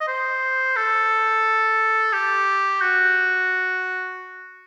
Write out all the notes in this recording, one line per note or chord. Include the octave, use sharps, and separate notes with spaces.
D#5
C5
A4
G4
F#4